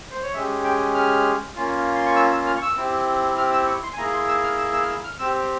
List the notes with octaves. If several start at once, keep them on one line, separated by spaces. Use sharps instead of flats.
C5
C#5
G#3 C#4 G4 E5
G5
F6
A#3 C#4 F4
C6
C#6
E6
E6
F6
C#6
E6
C4 E4 G4
F6
E6
C#6
C6
G#5
A#3 E4 G#4 A#5
C6
E6
F6
E6
E6
F6
E6
F6
C4 G4 E6